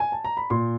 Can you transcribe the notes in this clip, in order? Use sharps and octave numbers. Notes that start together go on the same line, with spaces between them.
G#5
A5
A#5
B5
A#2 C6